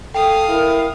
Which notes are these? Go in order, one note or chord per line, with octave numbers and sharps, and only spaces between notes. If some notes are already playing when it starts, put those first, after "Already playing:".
A4 F5 G5 D#6
E4 A#4